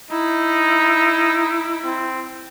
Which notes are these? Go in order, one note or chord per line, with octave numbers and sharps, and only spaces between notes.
D#4 E4
C4